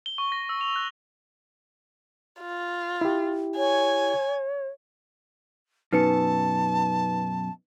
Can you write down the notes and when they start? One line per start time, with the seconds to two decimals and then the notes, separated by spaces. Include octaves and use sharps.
0.06 G7
0.18 C#6
0.32 A#6
0.49 E6
0.61 F7
0.76 F#6
2.41 F4
3.01 E4 G4
3.57 C#5 G#5
5.93 F#2 B2 D#4 B4 A5 C#7